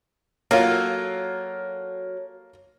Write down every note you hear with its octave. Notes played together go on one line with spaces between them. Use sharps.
F#3 A#3 F4 A4